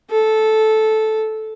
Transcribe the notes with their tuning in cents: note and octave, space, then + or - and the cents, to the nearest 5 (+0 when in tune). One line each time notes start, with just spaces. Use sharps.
A4 -10